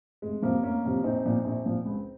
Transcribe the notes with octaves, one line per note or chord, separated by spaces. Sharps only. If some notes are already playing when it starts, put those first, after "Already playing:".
F1 G#3
F2 C3 F3 A#3
F1 A#3 C#4
F2 C3 F3
A#1 C4 D#4
A#2 F3
A#1
A#2 F3
C#2